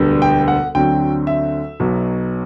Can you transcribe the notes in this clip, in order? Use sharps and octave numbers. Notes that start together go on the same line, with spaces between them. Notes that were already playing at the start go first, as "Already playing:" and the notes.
Already playing: E1 D2 D3 G3 B3
G5
F#5
D2 D3 F#3 C4 G5
E5
B1 B2 F#3